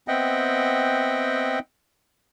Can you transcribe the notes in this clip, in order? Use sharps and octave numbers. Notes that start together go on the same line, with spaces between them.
B3 C4 D#5 E5 F#5 G5